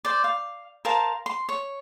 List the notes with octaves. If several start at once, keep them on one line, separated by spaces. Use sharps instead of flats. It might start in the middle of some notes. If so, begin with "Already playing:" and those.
C5 D5
F5
A#4 C5 F5 A5
C6
C#5